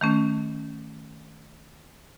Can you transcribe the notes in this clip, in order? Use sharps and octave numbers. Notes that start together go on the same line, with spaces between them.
D#3 A3 C#4